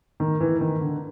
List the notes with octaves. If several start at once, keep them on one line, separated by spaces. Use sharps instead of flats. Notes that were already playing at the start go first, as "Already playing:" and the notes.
D#3
E3
D#3
D3